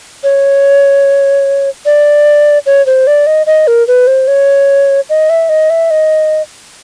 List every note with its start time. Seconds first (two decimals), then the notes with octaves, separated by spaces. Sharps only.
0.24 C#5
1.86 D5
2.66 C#5
2.86 C5
3.07 D5
3.27 D#5
3.46 D#5
3.67 A#4
3.88 B4
4.07 C5
4.28 C#5
5.10 D#5
5.30 E5
5.49 D#5
5.70 E5
5.91 D#5